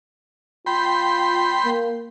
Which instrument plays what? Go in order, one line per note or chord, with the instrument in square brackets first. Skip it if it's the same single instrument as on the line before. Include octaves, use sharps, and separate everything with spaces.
[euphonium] F4 [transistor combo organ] G5 B5 C6
[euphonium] A#3